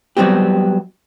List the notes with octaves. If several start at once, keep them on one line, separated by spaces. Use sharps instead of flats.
F#3 G3 B3 C4 G4